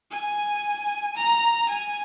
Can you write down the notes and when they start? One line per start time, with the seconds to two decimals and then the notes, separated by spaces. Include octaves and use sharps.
0.11 G#5
1.16 A#5
1.69 G#5